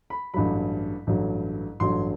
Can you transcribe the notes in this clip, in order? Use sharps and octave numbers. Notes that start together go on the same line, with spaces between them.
B5
A1 G2 F#3 B5
A1 G2 F#3
A1 G2 F#3 C6